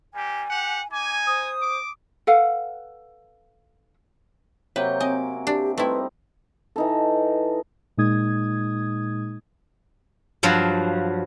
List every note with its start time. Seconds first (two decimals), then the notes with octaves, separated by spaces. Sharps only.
0.14 G3 A#3 G4 G#5
0.49 G4 F#5
0.91 D#4 G#5 D6
1.27 C5 D#6
1.61 D6
2.27 A4 B4 F5 F#5
4.76 C3 F#3 A#3 B4 C#5 G5 G6
5.00 C4 D#5 G#5
5.47 D4 G4
5.78 G3 A3 C4 D#4 E4 B4
6.76 E3 D#4 A4
7.97 A#2 G#3 D#4 D#6 G#6
10.43 G2 F3 F#3